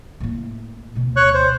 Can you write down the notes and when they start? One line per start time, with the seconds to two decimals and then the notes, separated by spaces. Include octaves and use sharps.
0.20 A2 A#3
0.95 D2 B2
1.16 C#5 C#6 F#6
1.34 C5